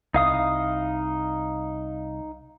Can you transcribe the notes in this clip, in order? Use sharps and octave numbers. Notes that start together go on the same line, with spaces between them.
C2 D#4 F5 D#6